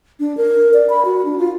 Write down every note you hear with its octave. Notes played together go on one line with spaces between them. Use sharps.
D4
A#4
D5
B5
F#4
D4
F4